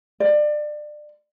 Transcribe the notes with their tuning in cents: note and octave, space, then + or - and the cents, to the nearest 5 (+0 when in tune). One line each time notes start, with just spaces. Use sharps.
D5 +25